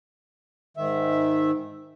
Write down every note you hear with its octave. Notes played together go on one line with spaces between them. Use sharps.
G#2 D#3 E5